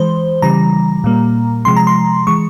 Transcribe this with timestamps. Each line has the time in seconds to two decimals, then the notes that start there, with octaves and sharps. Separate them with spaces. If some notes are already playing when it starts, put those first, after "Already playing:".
Already playing: E3 G#3 C5
0.42 C#3 E3 G3 A#5
1.04 A#2 G3 A#3
1.65 C3 F3 G#3 C6
1.76 A#5
1.87 C6
2.27 E3 G#3 C#6